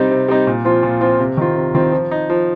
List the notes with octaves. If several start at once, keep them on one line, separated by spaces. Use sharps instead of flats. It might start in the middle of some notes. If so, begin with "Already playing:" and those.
Already playing: C3 G3 C4 D#4
C3
G3 C4 D#4
A#2
F3 C4 F4
A#2
F3 C4 F4
C3
D#3 C4 F4
C3
D#3 C4 F4
F3
D#4
F3